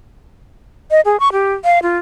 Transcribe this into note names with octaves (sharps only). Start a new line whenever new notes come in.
D#5
G#4
C#6
G4
F5
F4